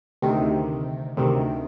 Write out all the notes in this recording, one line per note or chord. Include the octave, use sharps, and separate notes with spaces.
D2 C3 D#3
D2 C3 D#3